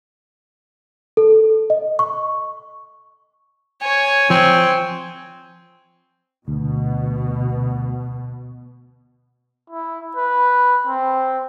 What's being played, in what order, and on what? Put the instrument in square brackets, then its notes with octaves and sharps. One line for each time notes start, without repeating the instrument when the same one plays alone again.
[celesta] A4
D#5
C#6
[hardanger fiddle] C#5 [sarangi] G#5
[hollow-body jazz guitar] F3 [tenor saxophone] C4
[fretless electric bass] D2 [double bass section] B2
[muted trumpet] E4
B4
C4